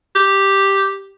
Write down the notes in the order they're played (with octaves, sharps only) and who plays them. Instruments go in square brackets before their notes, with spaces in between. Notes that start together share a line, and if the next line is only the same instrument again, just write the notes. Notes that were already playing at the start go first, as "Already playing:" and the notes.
[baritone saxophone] G4